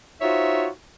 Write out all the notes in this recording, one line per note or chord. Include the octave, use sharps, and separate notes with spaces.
D#4 F4 F#4 C5 C#5 E5